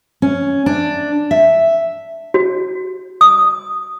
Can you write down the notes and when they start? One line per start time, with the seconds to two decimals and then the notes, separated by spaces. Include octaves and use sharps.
0.22 C#4
0.66 D4
1.31 E5
2.34 F#4
3.21 D#6